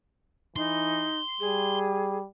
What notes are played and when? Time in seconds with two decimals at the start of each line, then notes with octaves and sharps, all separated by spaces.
0.56 E3 D#4 C6
1.40 G3 G#4